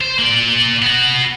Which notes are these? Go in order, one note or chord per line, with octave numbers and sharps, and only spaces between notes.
C5
A#3 D5
B3 F#4